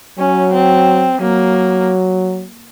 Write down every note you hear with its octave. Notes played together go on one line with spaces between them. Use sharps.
F#3 C#4
C4
F#3 A#3